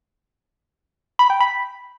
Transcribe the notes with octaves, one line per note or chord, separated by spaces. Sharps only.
B5
G5
B5